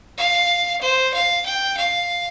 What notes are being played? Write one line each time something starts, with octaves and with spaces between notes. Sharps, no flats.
F5
C5
F5
G5
F5